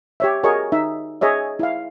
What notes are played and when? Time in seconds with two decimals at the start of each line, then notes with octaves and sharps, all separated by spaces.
0.20 G4 C#5 E5
0.43 F#4 G#4 A#4 C#5 D#5 C#6
0.72 D#4 E5
1.21 G#4 C#5 D#5 E5
1.59 E4 F5